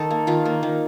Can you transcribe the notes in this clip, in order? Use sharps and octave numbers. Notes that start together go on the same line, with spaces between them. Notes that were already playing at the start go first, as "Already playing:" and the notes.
Already playing: D#3 A4
A#3
D#3 F4
A#3
D#3